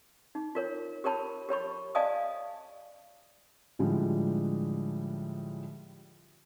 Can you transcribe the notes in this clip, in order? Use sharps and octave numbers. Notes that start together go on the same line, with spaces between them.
D#4
F4 A#4 C#5
G4 A#4 C#5 A5 B5
G4 C#5 B5 C#6
D5 D#5 F5 G#5 A5 D#6
A2 D3 F3 G3 G#3